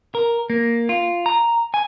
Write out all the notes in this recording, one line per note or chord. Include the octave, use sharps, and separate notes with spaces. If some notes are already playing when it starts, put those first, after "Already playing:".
A#4
A#3
F4
A#5
G#5